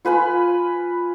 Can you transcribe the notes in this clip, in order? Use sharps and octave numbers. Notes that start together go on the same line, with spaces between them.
F4 B4 G#5 B5